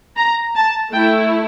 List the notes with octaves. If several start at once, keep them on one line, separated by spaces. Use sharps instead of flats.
A#5
A5
A3 E4 G5